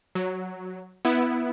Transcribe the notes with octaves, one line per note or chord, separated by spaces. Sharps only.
F#3
B3 E4